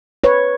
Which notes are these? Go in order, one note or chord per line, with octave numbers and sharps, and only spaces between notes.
B4 C#5